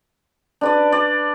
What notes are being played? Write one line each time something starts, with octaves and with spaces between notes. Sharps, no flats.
D4 B4 D5
D5